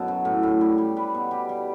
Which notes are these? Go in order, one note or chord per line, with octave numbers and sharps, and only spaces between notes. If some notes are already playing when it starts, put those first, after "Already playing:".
Already playing: F#2 B2 A4
F#3
A2
A2
G3
G3
G3 B4
B2
G3 G4
G3